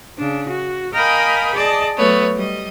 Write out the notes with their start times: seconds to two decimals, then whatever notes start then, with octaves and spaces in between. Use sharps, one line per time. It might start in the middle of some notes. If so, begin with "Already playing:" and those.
0.18 C#3 D4
0.48 F#4
0.93 A#4 D#5 F5 G5 G#5 B5
1.54 G#4 D5 D#5 A5
1.96 F#3 A3 B3 C#5
2.34 G3 D#5